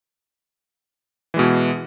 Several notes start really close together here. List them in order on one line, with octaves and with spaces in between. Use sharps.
E3 G#3 B2